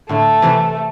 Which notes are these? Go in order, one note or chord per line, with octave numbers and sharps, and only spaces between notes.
A2 D3 A3
C3 E3